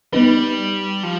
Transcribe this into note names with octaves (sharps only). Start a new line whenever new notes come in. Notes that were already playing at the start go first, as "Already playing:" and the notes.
G3 B3 D#4 B4
F3